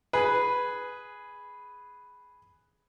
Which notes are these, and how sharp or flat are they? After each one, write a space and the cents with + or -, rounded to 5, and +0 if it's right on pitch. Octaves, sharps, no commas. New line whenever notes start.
G#4 +0 B4 +0